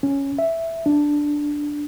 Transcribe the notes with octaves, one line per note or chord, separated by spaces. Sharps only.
C#4
E5
D4